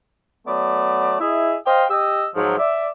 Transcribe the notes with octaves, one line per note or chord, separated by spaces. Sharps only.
F#3 A3 B3 D5
E4 G#4 D#5 E5
C5 D#5 F5 G5
G4 D#5 E6
G#2 F3 F#3
D5 E5